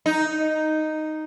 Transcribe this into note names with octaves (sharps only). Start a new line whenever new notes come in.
D#4